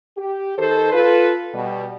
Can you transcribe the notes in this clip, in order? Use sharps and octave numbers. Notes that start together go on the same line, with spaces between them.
G4
D#3 A4 C5
F4 A4 B4
B2 G3